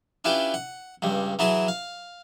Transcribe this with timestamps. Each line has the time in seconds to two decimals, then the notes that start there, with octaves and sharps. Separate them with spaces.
0.25 C#4 D4 E4 F4 G4 B4
0.54 F#5
1.02 C#2 G2 G3
1.39 E3 F#3 E4 G#4 A5
1.68 F5